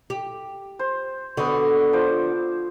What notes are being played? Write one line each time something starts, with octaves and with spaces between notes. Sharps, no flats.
G4
C5
D3 B3 F#4
F3 C5 D6